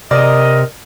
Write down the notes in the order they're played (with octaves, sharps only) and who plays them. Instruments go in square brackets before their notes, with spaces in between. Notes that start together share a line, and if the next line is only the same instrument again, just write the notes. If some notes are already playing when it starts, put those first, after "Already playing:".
[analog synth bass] C3 [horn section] A#4 D#5 [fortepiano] D5